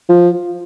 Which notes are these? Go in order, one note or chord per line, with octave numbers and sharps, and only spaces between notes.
F3